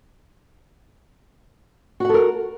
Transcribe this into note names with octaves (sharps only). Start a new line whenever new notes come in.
F#4 A4 A#4 F#5